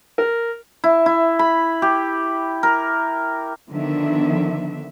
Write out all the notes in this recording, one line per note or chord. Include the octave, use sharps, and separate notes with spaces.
A#4
E4
E4
B5
G4
A#4
D3 D#3 F3 B3 D4 E5